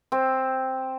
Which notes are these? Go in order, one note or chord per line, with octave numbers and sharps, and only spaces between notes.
C4